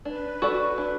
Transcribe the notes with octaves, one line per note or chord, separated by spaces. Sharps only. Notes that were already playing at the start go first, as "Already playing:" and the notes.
D4 B4
F#4 A4 D5
D4